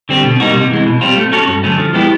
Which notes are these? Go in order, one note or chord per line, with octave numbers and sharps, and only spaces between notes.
D3 G3 C4
B2
G3 A#3 D#4 F#4
C3
E3 G#3
B2
G3 C4 F4
A3
C#4 F#4 A4 C#5
G2
D3 F#3 A3 C#4
F3
G#3 B3 E4 G4